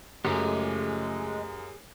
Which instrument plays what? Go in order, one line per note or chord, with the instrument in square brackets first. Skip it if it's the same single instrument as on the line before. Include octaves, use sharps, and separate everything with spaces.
[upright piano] F#2 [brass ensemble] C#3 F3 A3 [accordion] G#3 [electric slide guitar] G4 G#4